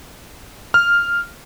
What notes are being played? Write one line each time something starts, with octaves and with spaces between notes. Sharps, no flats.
F6